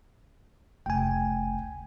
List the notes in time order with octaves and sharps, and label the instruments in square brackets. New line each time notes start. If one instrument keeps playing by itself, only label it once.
[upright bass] F1 C#2 [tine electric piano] G5 G#5